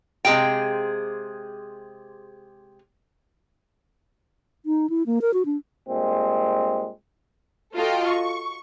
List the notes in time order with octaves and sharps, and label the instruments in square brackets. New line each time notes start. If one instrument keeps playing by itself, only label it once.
[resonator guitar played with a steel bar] C3 G#3 G#4 F5 G5
[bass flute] D#4
E4
A#3
A#4
F#4
D4
[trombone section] G2 A#2 G#3 C4
[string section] F4 F#4 A4 D#5 F5 G5
C#6